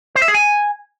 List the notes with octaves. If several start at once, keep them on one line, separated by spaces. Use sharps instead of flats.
C5
E5
G#4
G#5